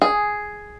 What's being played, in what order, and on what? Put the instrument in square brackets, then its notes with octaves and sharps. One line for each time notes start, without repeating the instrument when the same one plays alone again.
[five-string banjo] G#4